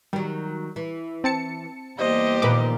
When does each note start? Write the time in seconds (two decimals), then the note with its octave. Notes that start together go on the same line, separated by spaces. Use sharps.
0.13 D#3 F#3 G3
0.76 E3
1.24 C4 A5 C#7
1.99 E2 G3 A#3 G4 C5 D#5
2.42 A#2 D#3 F3 B4 D6